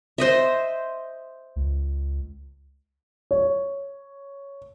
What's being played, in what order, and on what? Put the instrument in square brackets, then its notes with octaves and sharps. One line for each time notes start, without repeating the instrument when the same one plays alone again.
[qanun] C5 D#5 E5
[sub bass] C#2
[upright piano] C#5